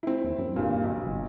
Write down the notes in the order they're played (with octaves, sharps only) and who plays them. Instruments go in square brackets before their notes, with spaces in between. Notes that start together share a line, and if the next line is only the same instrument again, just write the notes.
[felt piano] C4 E4
[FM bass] D#2
F#2
[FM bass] D#1 [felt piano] G2 A#2
[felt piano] B1
[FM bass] F#1